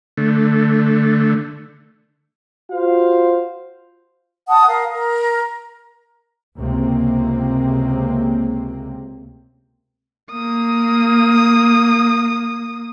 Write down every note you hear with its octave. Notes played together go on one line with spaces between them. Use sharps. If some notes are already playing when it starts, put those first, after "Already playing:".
D3 A3
F4 F#4 C5 F5
F#5 A5 D#6
A#4 F5
A#4
C#2 C3 A#3 C4
A#3 D#6